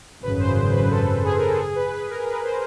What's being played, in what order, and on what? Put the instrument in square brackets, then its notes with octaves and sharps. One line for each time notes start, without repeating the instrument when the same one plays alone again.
[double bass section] G#1 F#2 C#3 [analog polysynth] B4
[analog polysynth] C5
C5
B4
A4
G#4
A#4
A4
G#4
B4
B4
A#4
B4
C5